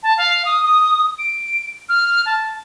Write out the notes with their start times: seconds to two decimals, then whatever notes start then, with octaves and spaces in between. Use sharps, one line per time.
0.03 A5
0.18 F5
0.45 D#6
0.63 D#6
1.19 D7
1.89 F6
2.26 A5